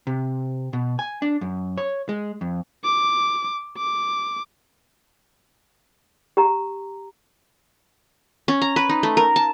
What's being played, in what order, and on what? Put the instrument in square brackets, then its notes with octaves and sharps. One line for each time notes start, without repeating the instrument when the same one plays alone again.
[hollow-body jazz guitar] C3
B2
G#5
D4
F#2
C#5
G#3
F2
[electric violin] D6
D6
[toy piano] G4 A#5
[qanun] C#4
A#5
B4
D#4
A3
A#4
A5